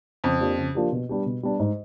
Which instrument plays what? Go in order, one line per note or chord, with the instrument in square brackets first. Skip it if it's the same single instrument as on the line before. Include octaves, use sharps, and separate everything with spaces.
[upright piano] F2 [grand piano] C#3
[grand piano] F3 A#3 D4 G4
C#3
F3 A#3 D4 G4
B2
G3 B3 D4 G4
B2
G3 B3 D4 G4
G#2